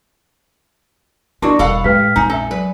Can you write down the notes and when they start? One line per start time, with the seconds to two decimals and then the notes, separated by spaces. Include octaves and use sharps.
1.42 B3 D4 E4 F#4 A#4 D5 D#5
1.59 E1 G3 A4 F5 F#5 B5 C#6
1.84 A2 G#3 G4 B4 G5 F6 B6
2.16 A#1 F2 D#4 G#5
2.30 C#4 A4 E5
2.51 F#3 B4